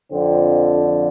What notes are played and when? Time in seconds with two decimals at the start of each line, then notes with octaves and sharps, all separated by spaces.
0.11 F2 D3 F3 C4